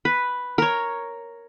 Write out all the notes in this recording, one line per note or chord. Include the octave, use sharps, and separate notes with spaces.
B4
A#4 C#5